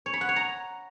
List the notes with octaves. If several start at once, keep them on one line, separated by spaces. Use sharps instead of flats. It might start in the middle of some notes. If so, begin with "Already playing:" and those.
C#5
B5
F#5
C#5
A#5